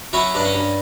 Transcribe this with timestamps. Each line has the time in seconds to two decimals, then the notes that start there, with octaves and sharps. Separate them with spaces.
0.13 F#3 C#4 E4
0.34 G2 D4
0.44 C#4
0.55 G2